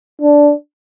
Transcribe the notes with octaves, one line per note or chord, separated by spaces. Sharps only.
D4